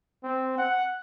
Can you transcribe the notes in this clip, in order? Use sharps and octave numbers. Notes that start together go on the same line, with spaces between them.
C4
F#5